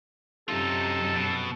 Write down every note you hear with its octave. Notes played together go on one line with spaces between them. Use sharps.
F#2 C3 D#4 F4 A4
B2